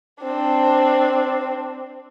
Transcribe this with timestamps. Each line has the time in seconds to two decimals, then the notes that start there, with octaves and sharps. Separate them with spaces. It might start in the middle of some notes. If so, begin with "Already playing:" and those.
0.22 C4 D4